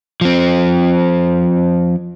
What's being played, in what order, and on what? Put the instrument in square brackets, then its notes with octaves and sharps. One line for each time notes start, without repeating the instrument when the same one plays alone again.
[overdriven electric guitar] F3 C4